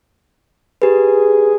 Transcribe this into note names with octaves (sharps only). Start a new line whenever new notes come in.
G4 G#4 B4